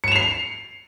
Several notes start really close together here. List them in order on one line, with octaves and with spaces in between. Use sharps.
C#7 E7 F7 C7